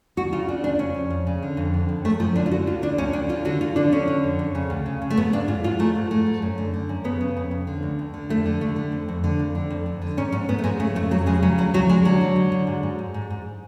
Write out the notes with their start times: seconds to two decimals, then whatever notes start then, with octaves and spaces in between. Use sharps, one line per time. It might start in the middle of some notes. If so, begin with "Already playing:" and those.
0.17 D2 F#4
0.32 C#3 F4
0.48 C#3 D4
0.64 D2 D4
0.79 F2 C#4
0.94 F2
1.10 F2
1.27 C#3
1.43 D3
1.57 F2
1.74 D3
1.89 F2
2.05 F#2 A3
2.20 F#2 F3
2.36 D3 D4
2.46 F4
2.51 D3 F#4
2.67 D2 F4
2.82 D3 D4
2.98 D2 C#4
3.13 D2 D4
3.29 D3 F4
3.45 D3 F#4
3.61 D3 F4
3.76 D3 D4
3.92 D3 C#4
4.08 D3
4.24 F2
4.39 F2
4.55 C#3
4.70 D2
4.86 C#3
5.02 C#3
5.10 A3
5.17 G#2 B3
5.33 G#2 D4
5.48 G#2 F4
5.64 G#2 F4
5.79 G#2 A3
5.95 G#2
6.11 G#2 A3
6.26 G#2
6.42 F#2
6.58 D3
6.74 D3
6.89 F#2
7.04 C#3 B3
7.21 C#3
7.37 F2
7.51 F2
7.67 D3
7.83 D2
7.99 D2
8.14 D3
8.29 F2 A3
8.46 D3
8.61 D3 A3
8.76 D3
8.92 F2
9.09 F2
9.24 D3
9.40 F2
9.55 D3
9.70 F2
9.86 F2
10.02 D3
10.17 G#2 C#4
10.32 G#2 C#4
10.49 G#2 B3
10.59 A3
10.64 G#2 G#3
10.80 C#3 A3
10.95 F2 A3
11.11 F2 F#3
11.26 C#3 G#3
11.42 C#3 F#3
11.58 D2 F#3
11.74 D2 F#3
11.89 D2 G#3
12.05 D3 F#3
12.21 D3
12.36 D3
12.52 D3
12.67 G#2
12.83 G#2
12.99 G#2
13.14 G#2
13.30 G#2